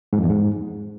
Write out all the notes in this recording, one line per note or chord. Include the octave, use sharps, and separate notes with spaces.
G#2
F2
E2
G#2